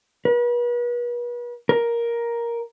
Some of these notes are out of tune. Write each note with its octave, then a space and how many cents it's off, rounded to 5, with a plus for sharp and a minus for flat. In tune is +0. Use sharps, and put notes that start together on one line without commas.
B4 -40
A#4 +10